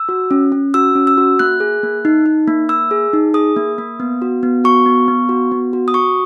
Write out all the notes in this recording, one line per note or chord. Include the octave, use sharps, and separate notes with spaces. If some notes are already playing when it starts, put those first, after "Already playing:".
Already playing: E6
F#4
C#4
C#4
F#4 E6
C#4
E6
F#4
A#3 F#6
G#4
A#3
D#4
D#4
A#3
A#3 E6
G#4
D#4
G#4 D#6
A#3
A#3
B3
F#4
B3
F#4 C#6
B3
B3
F#4
B3
F#4
D#6
F#4 C#6